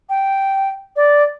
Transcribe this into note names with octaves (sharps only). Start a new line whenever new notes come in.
G5
D5